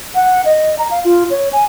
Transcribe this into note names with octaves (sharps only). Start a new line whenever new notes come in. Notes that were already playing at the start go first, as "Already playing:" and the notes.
F#5
D#5
A#5
F5
F4
C#5
G#5